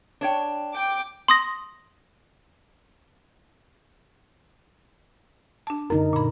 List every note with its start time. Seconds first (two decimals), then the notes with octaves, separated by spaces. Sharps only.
0.21 D4 C#5 G5
0.73 G5 D6
1.28 C6 D#6 A#6
5.67 D4 A5
5.90 F#2 D3 D#4 A#4
6.13 A#2 B5